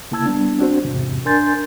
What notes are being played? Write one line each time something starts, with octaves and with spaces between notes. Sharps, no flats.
C#3 A#3 E4 A5 E6 G#6
G3 B3 D4
C4 D4 F#4 C5
E2 G#2 C3
D4 A#4 G#5 C6 G6 A6